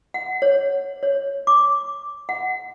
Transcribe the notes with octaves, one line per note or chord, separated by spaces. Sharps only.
F#5
C#5
C#5
D6
F#5